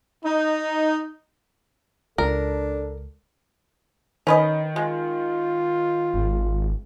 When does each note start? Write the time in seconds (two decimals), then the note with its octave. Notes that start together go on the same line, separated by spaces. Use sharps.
0.25 D#4
2.18 C#2 D4 A4 A#4
4.27 D#3 C#4 B4 D#5
4.76 G#3 F4
6.14 G#1